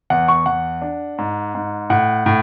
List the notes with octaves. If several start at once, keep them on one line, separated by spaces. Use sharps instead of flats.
E2 F#5
C#6
E2 F#5
D4
G#2
G#2
A2 F#5
A2